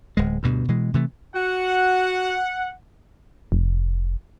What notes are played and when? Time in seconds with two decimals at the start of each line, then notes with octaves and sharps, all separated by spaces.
0.17 D1 G#3
0.43 D2 G2 B2
0.69 B2 E3 G#3
0.94 C3 E3 A3
1.35 F#4 F#5
3.52 F1